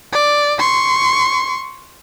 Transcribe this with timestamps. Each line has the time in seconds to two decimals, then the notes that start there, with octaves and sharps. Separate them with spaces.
0.13 D5
0.59 C6 C#6